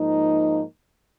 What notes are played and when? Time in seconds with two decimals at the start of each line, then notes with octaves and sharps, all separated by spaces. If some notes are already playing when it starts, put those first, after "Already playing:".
Already playing: G#2 F3 A#3 D#4